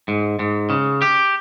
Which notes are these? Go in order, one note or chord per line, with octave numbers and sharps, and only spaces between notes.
G#2
G#2
C#3
G4